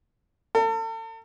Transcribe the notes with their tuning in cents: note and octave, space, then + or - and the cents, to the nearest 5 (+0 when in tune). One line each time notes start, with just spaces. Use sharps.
A4 +40